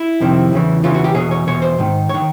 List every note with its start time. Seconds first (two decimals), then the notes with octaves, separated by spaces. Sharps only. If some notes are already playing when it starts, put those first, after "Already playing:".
Already playing: E4
0.20 F2 C3 D#3
0.53 E2 C#3 E3
0.83 E2 C#3 E3 F4
0.94 F#4
1.04 G4
1.15 E2 B2 G#4
1.31 C#5
1.47 E2 B2 C#5
1.62 C5
1.78 G#2 D#3
2.09 D#3 C#5